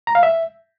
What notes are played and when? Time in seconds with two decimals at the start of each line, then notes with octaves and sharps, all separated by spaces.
0.07 A#5
0.15 F5
0.23 E5